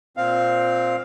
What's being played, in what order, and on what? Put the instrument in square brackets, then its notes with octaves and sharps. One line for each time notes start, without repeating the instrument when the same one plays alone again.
[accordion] A#2 C4 F5